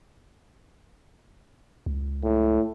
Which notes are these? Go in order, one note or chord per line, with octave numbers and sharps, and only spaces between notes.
C#2
A2